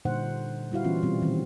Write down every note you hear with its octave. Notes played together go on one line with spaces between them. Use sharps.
A#2 D3 G3 D#4 C5 F#5
G3 E4 F#4 F5
E3 B3 C#4 F4
B2 G3 B3 C4
A#2 D#3 E3 G3 C4